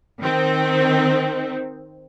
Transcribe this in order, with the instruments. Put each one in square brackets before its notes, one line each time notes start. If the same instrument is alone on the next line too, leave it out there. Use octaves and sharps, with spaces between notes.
[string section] D#3 C4